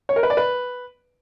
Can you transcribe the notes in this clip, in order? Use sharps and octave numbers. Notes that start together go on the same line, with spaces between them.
C#5
A#4
B4
D5
B4